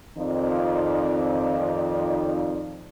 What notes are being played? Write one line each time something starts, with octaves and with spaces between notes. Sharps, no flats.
F2 D#3 F3 C4 D#4 D5